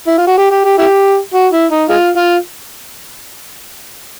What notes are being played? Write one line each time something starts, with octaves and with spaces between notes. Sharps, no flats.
E4
F4
F#4
G4
G4
G4
E4 G4
F#4
E4
D#4
G#3 F4
F4